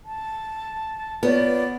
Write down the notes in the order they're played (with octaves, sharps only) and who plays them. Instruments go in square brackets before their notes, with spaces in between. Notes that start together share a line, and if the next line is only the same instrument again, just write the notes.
[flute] A5
[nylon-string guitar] B3 [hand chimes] F4 B4 C#5 [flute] D5